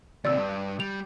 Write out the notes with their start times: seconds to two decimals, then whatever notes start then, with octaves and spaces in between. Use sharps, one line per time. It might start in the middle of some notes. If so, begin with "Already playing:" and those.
0.25 D#2 C3 D5 E6
0.37 G2
0.80 G3 F7